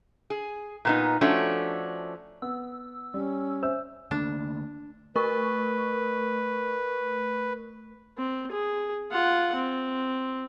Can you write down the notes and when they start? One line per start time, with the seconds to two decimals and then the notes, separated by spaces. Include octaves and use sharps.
0.30 G#4
0.85 A#2 B3 D#4
1.21 F3 A3 C#4 D4 F#4
2.42 B3 E6
3.14 G3 C#4
3.63 C5 E5 E6
4.11 D3 A3 A#3 D4
5.16 A3 A#4 B4 C#6
8.18 C4
8.51 G#4
9.11 F4 F#5
9.55 C4